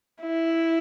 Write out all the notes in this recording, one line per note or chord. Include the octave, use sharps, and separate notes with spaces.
E4